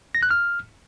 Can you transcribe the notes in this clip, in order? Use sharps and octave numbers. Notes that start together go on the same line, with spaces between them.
A#6
F#6
F6